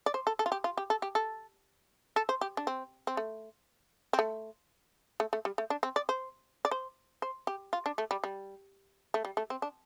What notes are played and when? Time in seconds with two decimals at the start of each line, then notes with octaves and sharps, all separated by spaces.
0.06 D5
0.14 C5
0.27 A4
0.39 A4
0.46 F4
0.52 G4
0.64 F4
0.78 G4
0.90 A4
1.02 G4
1.15 A4
2.16 A4
2.29 C5
2.41 G4
2.57 D4
2.67 C4
3.07 C4
3.17 A3
4.13 C4
4.19 A3
5.20 A3
5.33 A3
5.45 G3
5.58 A3
5.70 D4
5.83 C4
5.96 D5
6.09 C5
6.65 D5
6.71 C5
7.22 C5
7.47 G4
7.73 F4
7.86 D4
7.98 A3
8.11 G3
8.24 G3
9.14 A3
9.25 G3
9.37 A3
9.50 C4
9.62 D4